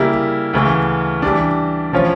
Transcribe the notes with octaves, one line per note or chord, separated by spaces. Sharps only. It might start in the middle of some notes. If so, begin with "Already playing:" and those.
Already playing: C#3 G3 A#3 E4
D2 C#3 E3
E3 G3 D4
A2 F3 C#4 F4 C#5